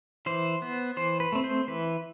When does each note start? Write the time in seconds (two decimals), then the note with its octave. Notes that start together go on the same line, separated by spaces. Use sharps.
0.26 E3 C5
0.62 B3
0.97 E3 C5
1.20 B4
1.32 A3 C4
1.44 C5
1.67 E3 B4